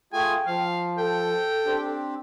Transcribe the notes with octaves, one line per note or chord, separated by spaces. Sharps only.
A3 F4 G#4 G5 G#5
F3 F5
A4 G5
C4 D4 G4